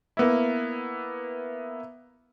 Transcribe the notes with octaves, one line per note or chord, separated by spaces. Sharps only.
A#3 B3 E4